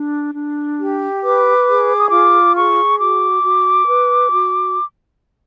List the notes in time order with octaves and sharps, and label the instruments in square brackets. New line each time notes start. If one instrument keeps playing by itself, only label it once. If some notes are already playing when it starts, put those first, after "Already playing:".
Already playing: [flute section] D4
D4
G4
B4 D6
G#4
D#6
F4 D6
G#4 C#6
F#4 D6
F#4
B4
F#4